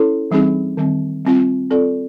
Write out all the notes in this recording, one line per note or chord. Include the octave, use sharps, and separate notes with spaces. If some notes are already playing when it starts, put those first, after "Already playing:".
Already playing: C#4 E4 A4 C#5
E3 G3 C4 D#4 G#4
D#3 G3 C4
G3 C4 F4
C4 F4 A4 D5